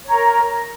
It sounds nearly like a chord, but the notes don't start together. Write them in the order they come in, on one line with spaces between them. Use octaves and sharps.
C#5 A#5 A#4